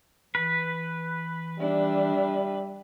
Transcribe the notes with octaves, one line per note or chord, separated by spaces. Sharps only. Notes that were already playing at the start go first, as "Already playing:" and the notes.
E3 B4
G3 D4 E5